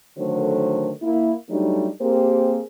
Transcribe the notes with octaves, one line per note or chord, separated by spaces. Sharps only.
D3 D#3 F#3 A3 A#4 C5
A#3 E4
F#3 G3 A3 D4 D#4
A#3 C4 G4 G#4 A#4 C5